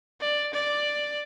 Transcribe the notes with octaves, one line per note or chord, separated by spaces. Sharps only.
D5
D5